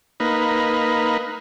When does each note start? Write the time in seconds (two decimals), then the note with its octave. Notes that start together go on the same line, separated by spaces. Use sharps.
0.20 A#3 D#4 B4